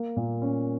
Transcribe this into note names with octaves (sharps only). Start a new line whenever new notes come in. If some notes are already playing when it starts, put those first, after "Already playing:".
Already playing: A#3
A#2
C#4